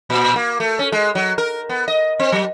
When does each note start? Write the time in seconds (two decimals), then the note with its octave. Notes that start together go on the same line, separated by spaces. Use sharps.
0.10 A#2
0.36 A#3
0.60 A3
0.79 C#4
0.92 G#3
1.15 F#3
1.38 A#4
1.69 B3
1.88 D#5
2.20 C4
2.32 F#3